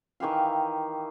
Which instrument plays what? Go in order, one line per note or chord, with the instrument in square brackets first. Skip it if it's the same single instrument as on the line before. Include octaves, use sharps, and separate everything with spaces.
[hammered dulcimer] D#3 E3 G4 F5